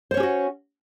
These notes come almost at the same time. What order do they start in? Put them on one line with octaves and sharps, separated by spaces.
C5 C#5 C#4 G4 F#4